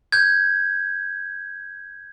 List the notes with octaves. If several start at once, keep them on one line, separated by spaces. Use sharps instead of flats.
G6 G#6